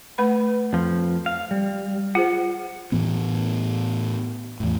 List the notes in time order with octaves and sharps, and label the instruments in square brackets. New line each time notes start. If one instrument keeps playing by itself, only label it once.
[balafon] A3 B4 B5
[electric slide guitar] F2 F3
F5
G3
[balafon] F4 G#4 C5 [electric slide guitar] F#5
[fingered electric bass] A2 E3 B3
E2 A2